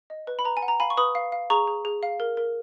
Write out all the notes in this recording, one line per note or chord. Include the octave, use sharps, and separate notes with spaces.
D#5
B4
B5
B4 A#5
G#5
F#5
A#5
F5 G#5 B5
C#6
B4 B5 D#6
F5
F5
G#4 A#5 C#6
G#4
G#4
F5
A#4
A#4